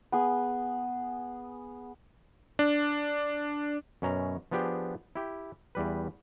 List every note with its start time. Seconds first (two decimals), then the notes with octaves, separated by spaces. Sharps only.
0.12 B3 G#4
2.59 D4
4.02 F#2 B2 C#4 A#5
4.51 F3 B3 D4 G4 G#4
5.15 E4 G4
5.75 E2 G3 B4